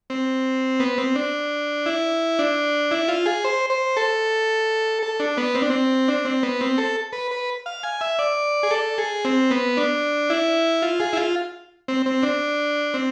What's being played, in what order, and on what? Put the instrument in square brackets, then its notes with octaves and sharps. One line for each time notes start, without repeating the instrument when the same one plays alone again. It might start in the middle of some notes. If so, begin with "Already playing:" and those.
[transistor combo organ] C4
B3
C4
D4
E4
D4
E4
F4
G#4
C5
C5
A4
A4
D4
B3
C4
D4
C4
D4
C4
B3
C4
A4
B4
B4
F5
G#5
E5
D5
G#4
A4
G#4
C4
B3
D4
E4
F4
G#4
E4
F4
C4
C4
D4
C4